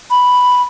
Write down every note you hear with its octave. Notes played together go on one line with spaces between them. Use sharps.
B5